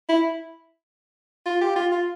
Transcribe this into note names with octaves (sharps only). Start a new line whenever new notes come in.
E4
F4
G4
F4
F4